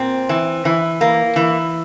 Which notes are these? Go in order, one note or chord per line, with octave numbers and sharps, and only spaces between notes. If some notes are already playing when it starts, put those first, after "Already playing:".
Already playing: A#2 C4
E3
E3
A#3
E3